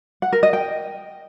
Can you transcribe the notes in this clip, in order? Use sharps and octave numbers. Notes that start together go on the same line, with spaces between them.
F#5
A#4
D#5
G5